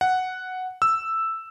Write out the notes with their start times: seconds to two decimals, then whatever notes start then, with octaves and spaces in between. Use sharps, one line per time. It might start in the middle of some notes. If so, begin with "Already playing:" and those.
0.01 F#5
0.82 E6